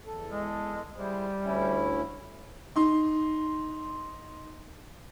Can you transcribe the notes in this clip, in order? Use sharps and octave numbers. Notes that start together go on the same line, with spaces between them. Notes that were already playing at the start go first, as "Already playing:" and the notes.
E2 A4
G#3
G3 E4 G#4 C5
D2 C#4 E4
D#4 C6